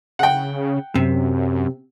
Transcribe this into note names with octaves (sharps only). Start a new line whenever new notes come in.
C#3 F#5 G5
F#2 C3